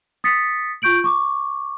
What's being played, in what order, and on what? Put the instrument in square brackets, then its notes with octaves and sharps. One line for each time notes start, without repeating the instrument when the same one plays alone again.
[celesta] D#6 A6 B6 C#7
F4 C#6 G6 D7 F#7
C#6 D6